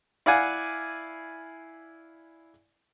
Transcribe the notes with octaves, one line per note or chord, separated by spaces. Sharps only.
E4 D5 F5 F#5 G#5